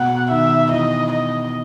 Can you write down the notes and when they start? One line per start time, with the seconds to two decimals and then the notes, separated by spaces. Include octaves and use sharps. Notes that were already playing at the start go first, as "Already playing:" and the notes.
Already playing: B2 F#5
0.30 D#3 E5
0.71 E3 D#5
1.12 D#5